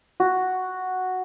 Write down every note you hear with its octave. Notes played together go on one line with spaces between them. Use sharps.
F#4